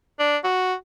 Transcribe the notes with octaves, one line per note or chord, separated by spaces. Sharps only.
D4
F#4